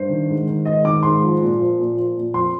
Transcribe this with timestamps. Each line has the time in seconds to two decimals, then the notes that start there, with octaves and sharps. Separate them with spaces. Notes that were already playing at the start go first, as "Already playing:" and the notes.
Already playing: G2 C5
0.09 D#3
0.29 G#2
0.47 D#3
0.65 G#2 D#5
0.85 D#3 D6
1.03 G#2 C6
1.22 F3
1.41 A#2
1.60 F3
1.79 A#2
1.97 F3
2.16 A#2
2.34 F2 C6